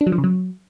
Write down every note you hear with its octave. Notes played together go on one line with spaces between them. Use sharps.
D4
F#3
F3
C#3
F#3